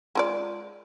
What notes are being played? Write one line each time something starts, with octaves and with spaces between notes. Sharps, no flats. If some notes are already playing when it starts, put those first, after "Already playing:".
G#3 F4 D5